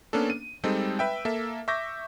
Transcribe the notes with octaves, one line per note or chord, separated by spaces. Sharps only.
A#3 B3 C#4 D4 A4
D#7
G3 G#3 C4 D#4 A4
B4 E5 G5
A#3 A4 E5
E5 C#6 D6 G6 A#6